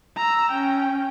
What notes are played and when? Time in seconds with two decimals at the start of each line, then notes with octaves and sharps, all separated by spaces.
0.17 A#5 E6
0.52 C#4 G5